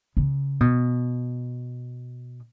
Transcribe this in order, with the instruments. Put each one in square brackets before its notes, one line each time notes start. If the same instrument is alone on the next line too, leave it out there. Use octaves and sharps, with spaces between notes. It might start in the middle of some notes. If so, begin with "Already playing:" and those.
[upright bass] C#3
B2